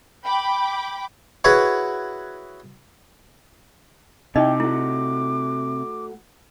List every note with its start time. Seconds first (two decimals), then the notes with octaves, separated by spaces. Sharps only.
0.24 G5 B5 D6
1.44 E4 F#4 G#4 B4 C#5 F#5
4.36 C3 D#4 E4 D#5 G5 D6
4.60 A3 E4 F#4